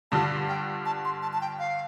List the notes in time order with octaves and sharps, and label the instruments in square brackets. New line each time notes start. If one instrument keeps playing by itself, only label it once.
[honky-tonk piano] G2 D3 G3 F4 [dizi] A5
[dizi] G5
A5
C6
A5
A5
G5
F5